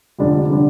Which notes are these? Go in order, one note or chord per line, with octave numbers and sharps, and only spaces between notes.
F1 F2 D3 G3 D4
D3 G3 D4